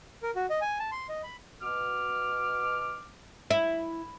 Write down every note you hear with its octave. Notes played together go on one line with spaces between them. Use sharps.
A#4
F#4
D#5
G#5
A5
C6
D#5
B5
B2 D6 F6
E4